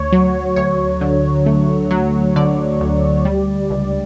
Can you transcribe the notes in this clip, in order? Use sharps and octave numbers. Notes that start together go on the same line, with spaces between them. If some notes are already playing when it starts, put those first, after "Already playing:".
Already playing: D2 C#5
F#3
D2 C#5
D3
A3
F#3
D3 D5
D2
G3
C#2